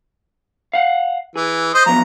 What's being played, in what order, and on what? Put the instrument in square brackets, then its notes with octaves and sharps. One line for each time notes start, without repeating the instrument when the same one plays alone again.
[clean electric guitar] F5 F#5
[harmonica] E3 [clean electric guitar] G#4
[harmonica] C5 D#5
[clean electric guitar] F3 F#3 B3 [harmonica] A#5